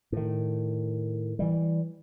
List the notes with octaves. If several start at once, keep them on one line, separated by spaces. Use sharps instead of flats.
A2 D#3
E3 G3